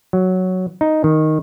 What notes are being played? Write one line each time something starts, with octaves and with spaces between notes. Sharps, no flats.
F#3
D#4
D#3